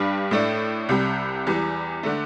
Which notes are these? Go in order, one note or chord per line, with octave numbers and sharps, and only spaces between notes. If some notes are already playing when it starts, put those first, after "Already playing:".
Already playing: G2 G3 D4
A2 A3 D4
C2 C3 G3
E2 E3 G3
D3 A3